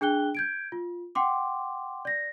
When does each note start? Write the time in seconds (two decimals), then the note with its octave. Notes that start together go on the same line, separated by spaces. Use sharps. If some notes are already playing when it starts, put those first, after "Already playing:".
0.01 D4 G#4 G5 F#6 G7
0.35 G6 G#6 D7
0.72 F4
1.15 F#5 G5 C6 D6
2.05 D5 A#6